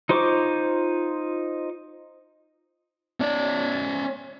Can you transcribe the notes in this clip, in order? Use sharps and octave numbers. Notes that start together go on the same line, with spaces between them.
D#4 F4 C5 C#6 D6
C#4 D5